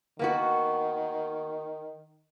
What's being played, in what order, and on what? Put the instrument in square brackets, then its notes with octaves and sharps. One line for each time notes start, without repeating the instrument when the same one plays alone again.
[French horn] D#3 [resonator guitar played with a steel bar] A#3 B3 F#4